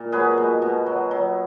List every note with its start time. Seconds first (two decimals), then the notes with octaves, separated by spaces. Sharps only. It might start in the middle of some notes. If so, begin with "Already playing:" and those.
Already playing: A#2
0.12 F#3 G#4 B4
0.37 B2
0.62 B2
0.86 F#3
1.11 F#3